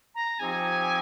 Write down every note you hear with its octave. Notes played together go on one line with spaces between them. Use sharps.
A#5
F3 C4 D#4 G4 G#5